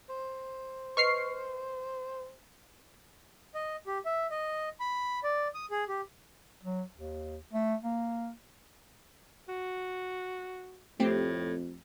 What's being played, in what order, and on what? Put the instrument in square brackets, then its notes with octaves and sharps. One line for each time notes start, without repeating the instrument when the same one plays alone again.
[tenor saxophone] C5
[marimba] B4 D#5 C6 [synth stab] C#6 F6 C7
[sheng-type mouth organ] D#5
G4
E5
D#5
B5
D5
D#6
G#4
G4
[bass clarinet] F#3
D#2
A3
A#3
[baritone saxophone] F#4
[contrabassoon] F2 [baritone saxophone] A2 [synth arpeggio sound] A3 C4 G4